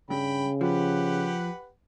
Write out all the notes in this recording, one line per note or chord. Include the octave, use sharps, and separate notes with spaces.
G2 C#3 G5 B5
F3 G4 B4 F#5